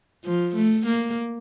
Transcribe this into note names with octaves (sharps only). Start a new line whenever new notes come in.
F3
A3
A#3